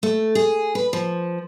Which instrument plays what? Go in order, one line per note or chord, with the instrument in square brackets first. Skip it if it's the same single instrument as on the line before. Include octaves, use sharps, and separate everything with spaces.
[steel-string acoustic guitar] A3
G#4
B4
F3